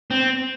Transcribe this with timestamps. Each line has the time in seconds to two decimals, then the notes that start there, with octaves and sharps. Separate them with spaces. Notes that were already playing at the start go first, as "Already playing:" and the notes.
0.11 C4